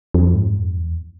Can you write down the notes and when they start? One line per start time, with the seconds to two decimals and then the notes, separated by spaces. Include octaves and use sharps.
0.14 F2
0.35 G#2
0.55 F2
0.76 E2